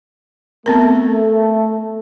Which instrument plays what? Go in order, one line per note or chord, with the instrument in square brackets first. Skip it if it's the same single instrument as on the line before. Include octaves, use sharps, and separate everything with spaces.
[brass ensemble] A3 [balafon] B3 C4 A#4